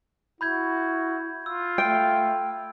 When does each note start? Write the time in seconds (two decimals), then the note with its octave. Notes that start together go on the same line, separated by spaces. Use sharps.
0.41 E4 F#4 B5 G6 G#6
1.46 F4 E6
1.78 A3 G5